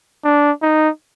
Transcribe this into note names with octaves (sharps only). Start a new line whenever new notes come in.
D4
D#4